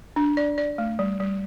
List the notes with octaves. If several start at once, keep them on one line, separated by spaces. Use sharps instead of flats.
D4
D5
D5
A3
G3
G3